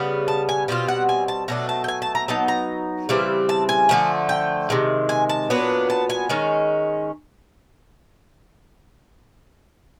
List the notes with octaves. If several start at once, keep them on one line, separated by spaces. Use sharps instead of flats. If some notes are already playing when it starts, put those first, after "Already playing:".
Already playing: C#3 G3 B3
A5
G#5
B2 G3 C4 F4
F#5
G#5
A5
B2 F#3 A3 D4 A#5
A5
G5
G#5
A5
A#5
F#3 B3 D#4 A5
A#5
C#3 E3 G3 C4
A5
G#5
D3 F3 A3
G5
C3 D#3 G#3
G#5
A5
A#2 F#3 B3 D4
A5
G#5
D#3 G#3 C#4